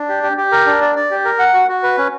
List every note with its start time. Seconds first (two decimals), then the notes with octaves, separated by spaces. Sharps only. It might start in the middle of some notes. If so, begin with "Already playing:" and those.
Already playing: D4
0.09 G4
0.23 G4
0.37 G4
0.52 A#4
0.66 D4
0.81 D5
0.95 D5
1.11 G4
1.25 A#4
1.39 F#5
1.54 F#4
1.69 F#4
1.83 B4
1.97 C#4